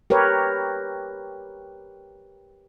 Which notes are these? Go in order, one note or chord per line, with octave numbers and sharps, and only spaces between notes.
G4 A#4 B4 C#5